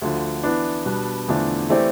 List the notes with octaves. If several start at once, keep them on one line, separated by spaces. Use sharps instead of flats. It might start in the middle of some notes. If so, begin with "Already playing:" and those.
D2 D3 F3
E3 B3 D4
B2 G3 B3 D4
E2 D3 F3 A3 D4
E3 A3 C4 G4 D5